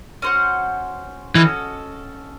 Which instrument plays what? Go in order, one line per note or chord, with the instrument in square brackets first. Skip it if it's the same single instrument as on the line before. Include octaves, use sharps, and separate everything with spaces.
[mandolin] C#4 F#4 C5 F#5
[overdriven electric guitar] E3 [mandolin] C#4 F#4 A4 D#5